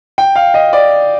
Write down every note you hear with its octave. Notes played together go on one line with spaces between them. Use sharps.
G5
F5
D#5
D5